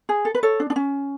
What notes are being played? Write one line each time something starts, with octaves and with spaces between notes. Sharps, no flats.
G#4
A4
B4
A4 C#5
D4
D4
C#4